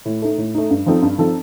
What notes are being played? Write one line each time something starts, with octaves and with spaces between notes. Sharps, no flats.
A2
A3 D#4
A2
A3 D#4
G2
F3 C4 D#4 A4
G2
F3 C4 D#4 A4